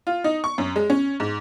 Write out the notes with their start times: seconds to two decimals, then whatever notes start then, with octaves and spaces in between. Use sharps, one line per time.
0.07 F4
0.24 D#4
0.44 C#6
0.58 F#2
0.76 G#3
0.90 C#4
1.20 G#2